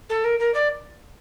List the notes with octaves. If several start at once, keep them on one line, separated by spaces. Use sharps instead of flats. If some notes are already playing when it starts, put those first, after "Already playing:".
A4
A#4
A#4
D5